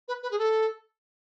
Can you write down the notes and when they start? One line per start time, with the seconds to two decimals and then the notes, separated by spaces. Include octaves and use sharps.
0.08 B4
0.23 B4
0.31 G#4
0.39 A4